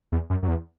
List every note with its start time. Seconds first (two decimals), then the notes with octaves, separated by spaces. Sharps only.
0.12 E2
0.30 F#2
0.42 F#2
0.48 E2